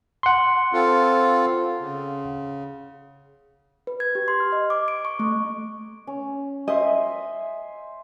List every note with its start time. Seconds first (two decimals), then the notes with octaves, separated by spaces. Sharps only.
0.23 F#5 C6
0.73 C4 F4 A4
1.80 C#3
3.87 B4
4.00 G#6
4.15 G4
4.28 C6
4.40 F6
4.52 D#5
4.70 D6
4.88 D7
5.05 C#6
5.19 A3
6.07 C#4
6.68 C5 D#5 E5 G#5